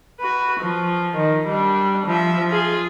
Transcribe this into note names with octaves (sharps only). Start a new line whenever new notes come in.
F#4 B4
F3
D#3
G3 D4
F3 E5
F4 G#4